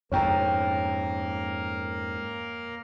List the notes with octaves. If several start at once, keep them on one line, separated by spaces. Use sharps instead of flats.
F2 G#2 A#3 A#4 C#5 G5 A#5